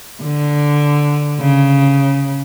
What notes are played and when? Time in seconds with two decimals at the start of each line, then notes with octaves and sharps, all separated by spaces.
0.23 D3
1.41 C#3